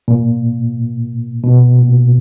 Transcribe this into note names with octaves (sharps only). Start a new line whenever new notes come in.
A#2
B2
A#2